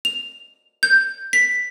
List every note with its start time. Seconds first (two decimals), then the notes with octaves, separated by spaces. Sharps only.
0.05 F7
0.83 G6
1.33 B6